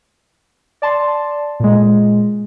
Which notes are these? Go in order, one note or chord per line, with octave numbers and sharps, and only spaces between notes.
D5 A5 C6
A#2 G#3